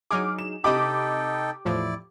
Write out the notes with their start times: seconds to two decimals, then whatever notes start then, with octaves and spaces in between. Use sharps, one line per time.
0.11 F#3 D#4 G#4 D6 F6
0.39 E7
0.64 C3 D#4 G4 A4 D#5 G5 B5 D6
1.65 E2 A2 F3 E4 D5